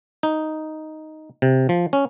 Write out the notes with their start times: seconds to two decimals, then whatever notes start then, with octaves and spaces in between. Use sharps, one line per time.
0.23 D#4
1.42 C3
1.69 F3
1.93 C#4